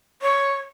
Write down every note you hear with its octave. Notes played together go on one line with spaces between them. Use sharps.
C#5